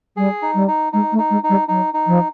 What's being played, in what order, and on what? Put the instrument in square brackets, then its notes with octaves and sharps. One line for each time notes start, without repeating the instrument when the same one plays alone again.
[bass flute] G3 [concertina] G#4
[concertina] D#4
[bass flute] G3
[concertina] D#4
[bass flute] G#3 [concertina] D#4
[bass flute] A3
[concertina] D#4
[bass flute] G#3
[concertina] D#4
[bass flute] G3
[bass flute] F#3 [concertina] D#4
[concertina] D#4
[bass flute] F3